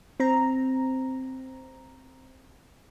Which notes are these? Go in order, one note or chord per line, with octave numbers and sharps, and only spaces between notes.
C4 A#5